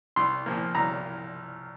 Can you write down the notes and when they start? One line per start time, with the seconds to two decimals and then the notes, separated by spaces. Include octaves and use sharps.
0.16 C2 C6
0.46 A#2 F3 A#3
0.75 C2 A#5